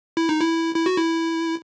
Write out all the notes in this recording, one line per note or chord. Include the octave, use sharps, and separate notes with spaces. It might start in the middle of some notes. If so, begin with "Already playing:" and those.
E4
D#4
E4
E4
F#4
E4